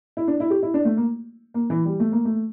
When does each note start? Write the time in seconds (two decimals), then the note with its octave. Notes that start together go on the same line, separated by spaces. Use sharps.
0.17 E4
0.28 D4
0.40 E4
0.50 G4
0.63 E4
0.74 D4
0.85 A3
0.97 A#3
1.54 A#3
1.70 E3
1.85 G3
2.00 A3
2.12 A#3
2.25 A3